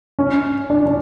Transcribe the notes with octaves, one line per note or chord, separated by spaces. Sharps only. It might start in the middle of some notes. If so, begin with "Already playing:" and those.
C#4
D4
D4